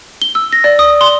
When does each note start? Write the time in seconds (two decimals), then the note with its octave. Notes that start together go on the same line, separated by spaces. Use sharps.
0.22 G7
0.35 E6
0.53 A#6
0.64 D5
0.79 D#6
1.01 C6